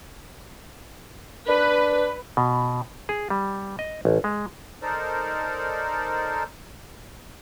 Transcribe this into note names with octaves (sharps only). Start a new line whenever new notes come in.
D4 B4
B2
G#4
G3
D#5
A1
G#3
D#4 A4 A#4 C5 D5